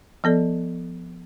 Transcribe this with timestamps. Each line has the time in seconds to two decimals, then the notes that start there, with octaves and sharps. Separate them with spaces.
0.24 F3 B3 A4 D5